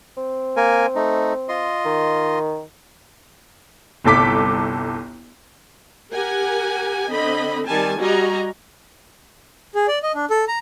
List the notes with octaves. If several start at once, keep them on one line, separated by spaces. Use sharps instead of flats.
C4
A#3 A#4 G#5
A3 D#4
F4 D#5 C6
D#3
G1 C2 A4 D6 B6
G4 A#4 F#5 G#5
D3 C4 D#5 B5
D#3 G3 G#5 A5
G3 F#4 D#5 G#5 A#5
G#4
D5
D#5
D4
A4
A#5